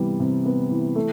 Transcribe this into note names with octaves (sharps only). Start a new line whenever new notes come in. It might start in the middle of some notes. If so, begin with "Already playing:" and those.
Already playing: C3 E3 G3 B3
C3
B3
E3
A3